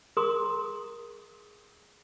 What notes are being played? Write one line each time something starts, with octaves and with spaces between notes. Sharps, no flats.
G#4 A#4 A#5 C6 D#6